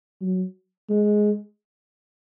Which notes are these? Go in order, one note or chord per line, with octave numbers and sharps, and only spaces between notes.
F#3
G#3